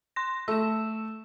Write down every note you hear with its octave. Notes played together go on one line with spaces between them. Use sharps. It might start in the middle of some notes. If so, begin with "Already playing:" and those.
C6 A#6
A3 E6 E7